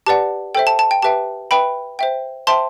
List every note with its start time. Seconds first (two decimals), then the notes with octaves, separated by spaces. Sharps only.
0.06 G4 B4 D5 F#5 A5
0.55 A4 C5 E5 G5
0.67 A5
0.79 A5
0.91 G5
1.02 G4 B4 E5 G5 A5
1.51 B4 E5 G5 B5
1.99 C5 E5 G5
2.47 C5 E5 G5 A5 C6